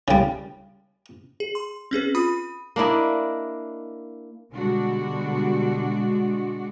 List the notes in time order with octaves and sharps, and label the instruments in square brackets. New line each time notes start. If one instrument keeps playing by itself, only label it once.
[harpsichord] C#3 G3
[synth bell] G#4
C6
C4 C#4 G#4 B4
F4 B5 D#6
[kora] A#3 D4 E4 D#5
[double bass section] B2 D3 G3 [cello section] G#3 D4 F#4